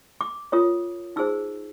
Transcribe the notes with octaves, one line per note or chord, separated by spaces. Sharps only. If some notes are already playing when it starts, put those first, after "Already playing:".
D6
F4 A#4 C#5 D#6
D#4 G#4 C5 E6